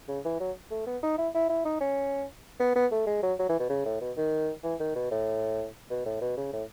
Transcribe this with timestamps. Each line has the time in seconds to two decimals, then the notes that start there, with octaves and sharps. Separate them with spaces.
0.08 C#3
0.25 E3
0.40 F#3
0.71 A3
0.86 B3
1.03 D#4
1.18 E4
1.35 E4
1.49 E4
1.65 D#4
1.81 C#4
2.60 B3
2.76 B3
2.92 A3
3.07 G#3
3.22 F#3
3.39 F#3
3.49 E3
3.59 B2
3.69 C#3
3.85 A2
4.01 B2
4.17 D#3
4.63 E3
4.80 D#3
4.95 B2
5.11 A2
5.90 B2
6.06 A2
6.21 B2
6.37 C#3
6.52 A2